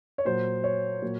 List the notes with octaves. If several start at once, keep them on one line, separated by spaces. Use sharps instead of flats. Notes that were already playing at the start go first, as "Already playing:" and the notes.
C#5
A#2 F#3 C5
C#5
A#2 F#3